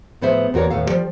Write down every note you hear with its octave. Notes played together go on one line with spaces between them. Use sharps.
A2 F3 B3 G#4 C5 E5
E2 A#3 F#4 A#4 C#5 D5
D#2 A2 B3 A4 F5
F3 G3